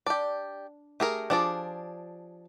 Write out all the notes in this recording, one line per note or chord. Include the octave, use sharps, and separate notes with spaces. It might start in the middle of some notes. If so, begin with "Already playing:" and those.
D4 G4 D5
A3 G4 G#4 A#4
F3 D4 G#4 D5